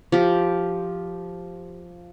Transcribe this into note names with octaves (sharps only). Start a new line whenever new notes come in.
F3 G4